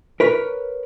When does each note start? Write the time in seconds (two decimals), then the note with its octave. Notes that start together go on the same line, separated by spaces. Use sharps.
0.20 A#4 B4 C#5